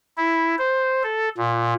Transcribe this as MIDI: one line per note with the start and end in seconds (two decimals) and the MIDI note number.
0.17 0.56 64
0.59 1.03 72
1.03 1.29 69
1.37 1.74 46